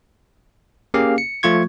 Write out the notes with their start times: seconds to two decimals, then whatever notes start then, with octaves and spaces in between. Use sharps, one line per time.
0.94 A#3 C#4 G4 G#4 F5
1.18 C#7
1.43 F3 A3 F4 C#6 G#6